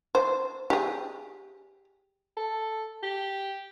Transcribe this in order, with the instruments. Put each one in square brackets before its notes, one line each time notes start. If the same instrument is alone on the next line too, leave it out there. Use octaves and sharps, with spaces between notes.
[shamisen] C5
G4 G#4
[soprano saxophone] A4
G4